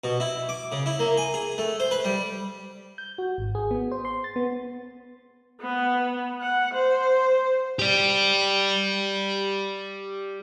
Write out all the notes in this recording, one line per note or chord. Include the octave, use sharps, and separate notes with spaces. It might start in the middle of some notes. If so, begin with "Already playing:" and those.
B2
E4
D6
C#3
E4
A#3
G#5
G#4
A3
C5
B4
G3
G6
F#4
G#1
G#4
B3
C5
C6
A6
B3
B3
F#5
C5
G4 D5